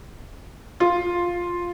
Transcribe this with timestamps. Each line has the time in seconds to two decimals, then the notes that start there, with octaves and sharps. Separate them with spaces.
0.80 F4